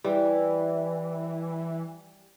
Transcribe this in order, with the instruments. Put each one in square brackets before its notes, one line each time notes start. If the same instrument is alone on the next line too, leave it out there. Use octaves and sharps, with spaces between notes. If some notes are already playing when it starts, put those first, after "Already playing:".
[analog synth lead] E3 [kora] G3